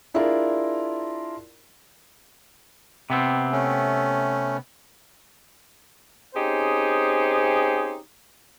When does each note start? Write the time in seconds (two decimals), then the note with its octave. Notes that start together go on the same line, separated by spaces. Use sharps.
0.14 D4 E4 F4 G#4 A#4 D5
3.10 C3 B3 C4
3.51 A3 C#4
6.35 C4 C#4 D#4 G4 G#4 C5